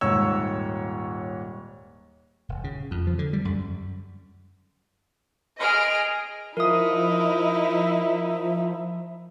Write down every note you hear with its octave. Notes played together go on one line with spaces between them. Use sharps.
D#1 G#2 C#5 E6
D#1
C#3
F2
F3
D3
G3
F#2
G#4 D#5 F6 D7
F3 D#4 E4 A#4 E5 D#6